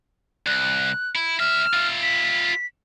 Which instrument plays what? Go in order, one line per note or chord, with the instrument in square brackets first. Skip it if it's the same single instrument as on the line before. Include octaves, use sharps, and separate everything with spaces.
[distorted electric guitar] C2 [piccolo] F#6
[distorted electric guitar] E4
[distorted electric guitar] D2 E5 [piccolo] F6
[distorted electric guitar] F4 E5
[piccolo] B6